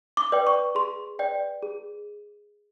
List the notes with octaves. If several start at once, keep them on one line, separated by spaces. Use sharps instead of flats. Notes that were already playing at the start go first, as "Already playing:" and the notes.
D6
B4 D5 G5
C#6
G#4 C6
B4 D5 G5
G#4